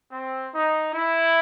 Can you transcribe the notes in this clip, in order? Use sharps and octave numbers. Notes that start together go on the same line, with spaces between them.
C4
D#4
E4